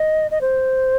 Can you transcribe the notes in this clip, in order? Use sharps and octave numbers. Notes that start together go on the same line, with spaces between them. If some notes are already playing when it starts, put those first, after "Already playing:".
Already playing: D#5
D#5
C5